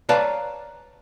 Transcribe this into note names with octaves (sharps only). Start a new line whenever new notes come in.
B4 C#5 D5 F5 A5 A#5